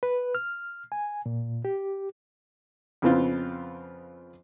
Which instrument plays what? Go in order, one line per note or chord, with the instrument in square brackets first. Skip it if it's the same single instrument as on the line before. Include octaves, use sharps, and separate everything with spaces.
[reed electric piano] B4
F6
G#5
A#2
G4
[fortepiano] F2 C#3 B3 C4 F4